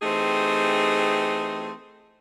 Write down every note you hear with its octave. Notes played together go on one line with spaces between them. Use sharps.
E3 A3 C4 D#4 G4 G#4